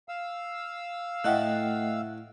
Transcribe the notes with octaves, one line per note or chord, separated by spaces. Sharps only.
F5 E6
A2 A3 D#5 E5 F#5 G5 A5 F#6